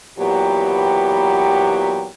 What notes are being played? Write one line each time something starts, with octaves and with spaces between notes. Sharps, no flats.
A#2 E3 F#3 B3 G4